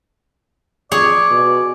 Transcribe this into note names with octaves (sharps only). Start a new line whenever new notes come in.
F2 G#4 C#5 D5
B2